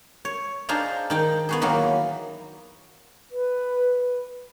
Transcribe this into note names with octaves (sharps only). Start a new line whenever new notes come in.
C#5
D4 D#4 F4 G#4 C5 A#5
D#3 D#4 G5
B3 F#4 G#4
D#3 E3 F#3 A#3
B4